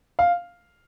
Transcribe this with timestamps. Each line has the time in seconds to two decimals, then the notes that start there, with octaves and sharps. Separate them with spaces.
0.19 F5